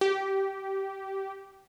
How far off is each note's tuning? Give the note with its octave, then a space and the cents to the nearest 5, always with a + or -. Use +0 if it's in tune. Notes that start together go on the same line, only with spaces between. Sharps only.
G4 -15